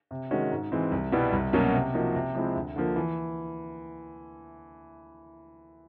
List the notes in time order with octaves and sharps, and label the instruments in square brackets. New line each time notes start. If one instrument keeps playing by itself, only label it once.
[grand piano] C3
D#3 G#3 C#4 F#4
G#2
E3 G#3 C4
C2
B2 G3 B3 E4
C2
B2 F#3 A#3 C#4
C3
F3 A#3 D#4 F#4
C3
F3 G#3 C4 E4
D2
D3 F3 A#3
E3